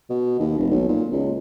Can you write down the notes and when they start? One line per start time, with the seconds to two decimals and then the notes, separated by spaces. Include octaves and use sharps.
0.10 B2
0.39 D#2
0.58 F1
0.71 B1
0.88 A#2
1.12 C#2